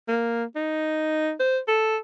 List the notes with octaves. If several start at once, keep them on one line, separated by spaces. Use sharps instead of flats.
A#3
D#4
C5
A4